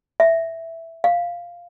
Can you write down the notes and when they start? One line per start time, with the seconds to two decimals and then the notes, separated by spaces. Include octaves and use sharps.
0.20 E5
1.04 F5